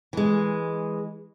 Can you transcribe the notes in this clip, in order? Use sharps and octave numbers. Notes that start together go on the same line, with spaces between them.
E3 G#3